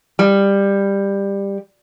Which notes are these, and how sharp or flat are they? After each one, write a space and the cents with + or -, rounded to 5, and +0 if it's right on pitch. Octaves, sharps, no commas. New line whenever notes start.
G3 +15